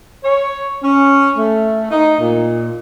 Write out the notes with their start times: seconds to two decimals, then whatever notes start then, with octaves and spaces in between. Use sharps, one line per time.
0.24 C#5
0.83 C#4
1.36 A3
1.91 D#4
2.20 A#2